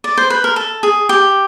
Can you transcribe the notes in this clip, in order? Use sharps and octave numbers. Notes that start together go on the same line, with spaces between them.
D5
C5
B4
A#4
A4
G#4
G4